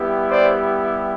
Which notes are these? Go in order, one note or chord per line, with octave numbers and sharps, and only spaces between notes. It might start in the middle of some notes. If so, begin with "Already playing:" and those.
Already playing: G3 B3 E4 G4
C5 D5